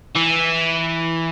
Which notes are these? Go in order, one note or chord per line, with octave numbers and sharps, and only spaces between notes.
E3